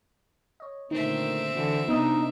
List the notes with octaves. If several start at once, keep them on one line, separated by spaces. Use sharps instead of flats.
C#5 D#5
A#2 D3 D#3 A3 C4 D#4 E5
D3 E3 F#4
C3 A#3 B3 D4 D#4 D#6